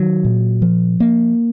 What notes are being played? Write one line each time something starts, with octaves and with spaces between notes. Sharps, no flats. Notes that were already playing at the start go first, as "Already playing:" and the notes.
Already playing: D#3 F#3
A#2
F3
A#3